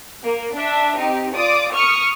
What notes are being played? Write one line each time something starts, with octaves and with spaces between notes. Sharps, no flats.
A#3
D4 E5
C4 D#4 G4
F4 D5 D6 D#6
C#6 D#6 F6 C#7